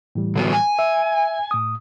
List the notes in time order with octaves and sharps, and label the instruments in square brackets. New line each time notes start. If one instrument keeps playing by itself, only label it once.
[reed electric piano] A2 E3 G3
[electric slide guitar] D3 F#3 B3
G#5
[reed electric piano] E5
A2 D#6